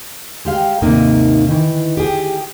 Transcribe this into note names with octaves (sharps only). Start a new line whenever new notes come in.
G#3 G4 F5
D#2 G#2 C3 A#3 D#4
D#3 E3
G4 G#4